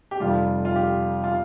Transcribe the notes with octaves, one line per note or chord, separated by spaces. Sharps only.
G4
F1 F2 C3 G3 F4
F4
G4
F4